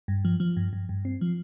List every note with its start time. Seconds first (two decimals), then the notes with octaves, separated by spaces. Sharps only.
0.08 G2
0.25 F3
0.40 F3
0.57 G2
0.73 G2
0.89 G2
1.05 C4
1.21 F3